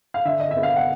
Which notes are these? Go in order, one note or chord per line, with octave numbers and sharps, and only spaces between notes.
F5
D3 E5
D#5
E5
B3
F5
F#5